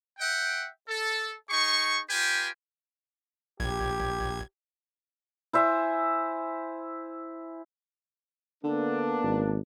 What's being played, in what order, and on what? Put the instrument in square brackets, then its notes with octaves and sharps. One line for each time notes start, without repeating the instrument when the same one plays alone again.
[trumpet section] E5 F#5 G5
A4
D#4 G#4 C#6
F4 G4 B4 G5 G#5
[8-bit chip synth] A#1 G#6 [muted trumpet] G4
[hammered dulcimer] E4 C5 E5 G#5
[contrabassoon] D3 [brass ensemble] A#3 B3 D4
[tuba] G#1